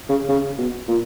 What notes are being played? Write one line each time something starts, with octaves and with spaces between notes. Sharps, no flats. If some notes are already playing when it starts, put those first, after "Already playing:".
C#3
C#3
B2
A#2